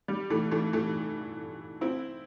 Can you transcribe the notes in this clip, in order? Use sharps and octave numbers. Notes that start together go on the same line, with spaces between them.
G3
E3 A3
E3 A3
E3 A3
C4 E4